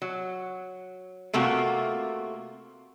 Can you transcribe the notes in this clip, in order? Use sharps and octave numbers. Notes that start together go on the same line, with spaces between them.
F#3
C3 A3 A#3 F4 F#4